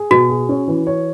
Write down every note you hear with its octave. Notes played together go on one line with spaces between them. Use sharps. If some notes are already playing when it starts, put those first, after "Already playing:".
Already playing: G#4
B2 F#4
G#4
C#4
E3
C#5